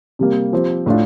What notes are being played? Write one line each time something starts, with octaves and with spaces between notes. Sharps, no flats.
C3 G3 A#3
F3 C4 G4 C5
A2 A3 D4 F4